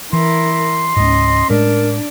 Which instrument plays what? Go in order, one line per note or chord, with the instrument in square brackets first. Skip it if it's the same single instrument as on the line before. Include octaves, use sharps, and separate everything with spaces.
[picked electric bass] E3 [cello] E4 A#4 [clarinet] C6
[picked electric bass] C#2 G#2 [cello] C#4 D#5
[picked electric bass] A2 G#3 C#4 [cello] D4 [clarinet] A#4